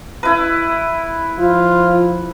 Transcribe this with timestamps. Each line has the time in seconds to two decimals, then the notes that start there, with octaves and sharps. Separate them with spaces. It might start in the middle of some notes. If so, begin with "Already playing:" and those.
0.23 E4 B4
1.39 F3 F4